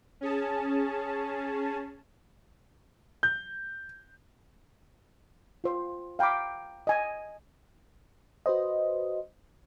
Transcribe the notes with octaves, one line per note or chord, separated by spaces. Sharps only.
C#4 G#4 A5
G6
F4 C5
F5 G5 A#5 B5 D6
D#5 G#5 D#6
F#4 B4 C5 D#5